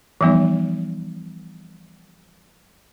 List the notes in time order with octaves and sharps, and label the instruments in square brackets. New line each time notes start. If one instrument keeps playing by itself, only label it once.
[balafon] E3 F3 G3 B3 D#4